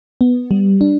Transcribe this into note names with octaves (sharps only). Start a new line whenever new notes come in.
B3
G3
D4